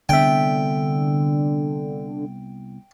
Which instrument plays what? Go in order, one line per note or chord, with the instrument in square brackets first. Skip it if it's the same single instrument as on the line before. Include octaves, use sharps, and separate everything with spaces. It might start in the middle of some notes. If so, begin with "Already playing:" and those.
[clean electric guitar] C2 B3 E5 [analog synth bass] D3 [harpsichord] G5